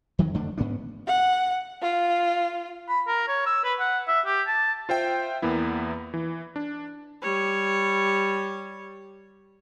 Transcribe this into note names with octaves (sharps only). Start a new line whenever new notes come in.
F2 D#3 F#3
F2 D3 A3 D4
G#2 B3 C#4 D4
F#5
F4
B5
A#4
C#5
E6
B4
F#5
E5
G4
A5
F4 C5 E5 G5
E2 A#3 B3 E4
E3
D4
G3 C#5